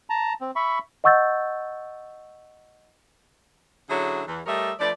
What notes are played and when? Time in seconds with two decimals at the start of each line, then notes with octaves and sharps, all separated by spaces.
0.10 A5 A#5
0.41 C4
0.56 E5 B5 C#6
1.04 D#5 F#5 C#6 E6 G6 A6
3.90 D3 F#3 C#4 E4 G#4 C#5
4.28 E2 E3
4.46 G3 A3 A#4 C#5 D#5 E5
4.80 F3 A3 B4 D5